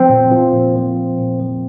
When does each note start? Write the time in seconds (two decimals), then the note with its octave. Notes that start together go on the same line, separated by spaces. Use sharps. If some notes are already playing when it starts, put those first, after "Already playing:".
Already playing: F3 C4
0.10 A#2
0.31 F3
0.53 A#2
0.76 F3
0.97 A#2
1.19 A#2
1.40 F3